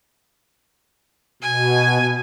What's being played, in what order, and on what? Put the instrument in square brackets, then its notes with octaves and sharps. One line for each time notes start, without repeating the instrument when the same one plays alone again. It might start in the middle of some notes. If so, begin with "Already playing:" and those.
[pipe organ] B2 [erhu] G#5